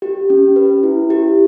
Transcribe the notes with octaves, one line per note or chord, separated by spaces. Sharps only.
G4
C#4
B4
E4
G4